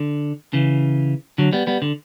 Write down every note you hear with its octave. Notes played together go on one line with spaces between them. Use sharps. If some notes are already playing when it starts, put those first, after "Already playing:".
Already playing: D3
C#3 E3
D3 F#3
G3 B3
G3 B3
D3